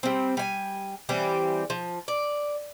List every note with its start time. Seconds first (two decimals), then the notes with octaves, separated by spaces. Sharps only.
0.03 G3 C4
0.37 G3 G#5
1.09 E3 G3 C4 G4
1.70 F3
2.08 D5